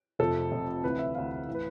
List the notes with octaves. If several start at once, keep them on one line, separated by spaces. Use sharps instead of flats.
F1 F2 C3 F3 A4
F1 F2 C3 F3
D2 C3 E3 B4
E5
D2 C3 E3 F5
A2 E3
B4